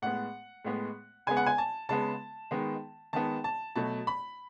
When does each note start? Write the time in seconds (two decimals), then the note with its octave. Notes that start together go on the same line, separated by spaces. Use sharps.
0.02 A2 G#3 B3 F#5
0.65 A2 G#3 B3
1.27 C#3 G#3 B3 G#5
1.37 F#5
1.46 G#5
1.58 A5
1.89 C#3 G#3 B3 A5
2.51 D#3 G#3 B3
3.13 D#3 G#3 B3 A5
3.44 A5
3.76 B2 F#3 A3 A5
4.07 B5